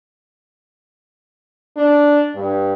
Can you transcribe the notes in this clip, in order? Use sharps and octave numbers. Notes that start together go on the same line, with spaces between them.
D4
G2